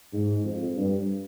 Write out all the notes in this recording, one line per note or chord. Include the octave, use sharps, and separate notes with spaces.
G#2
F2
G2